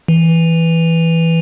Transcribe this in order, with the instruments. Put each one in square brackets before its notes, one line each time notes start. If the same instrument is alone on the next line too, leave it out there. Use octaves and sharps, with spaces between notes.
[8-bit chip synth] E3